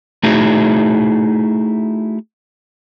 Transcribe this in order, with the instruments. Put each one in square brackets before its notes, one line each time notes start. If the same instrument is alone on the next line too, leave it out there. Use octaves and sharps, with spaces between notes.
[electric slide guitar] A3 D#4 E4 F#4 G#4